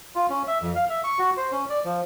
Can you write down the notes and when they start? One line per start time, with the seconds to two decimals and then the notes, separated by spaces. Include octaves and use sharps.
0.16 F4
0.30 C#4
0.48 E5
0.62 F2
0.76 F5
0.90 E5
1.04 C#6
1.19 F#4
1.37 C5
1.52 C#4
1.70 D5
1.85 F3